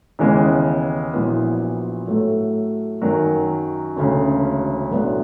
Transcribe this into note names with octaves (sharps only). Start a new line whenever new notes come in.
D#2 C#3 E3 G#3 B3
A#1 A#2 F#3 B3 E4
A2 F#3 A3
F#2 D#3 F#3
E1 D2 C#3
B1 A2 F#3 B3 D4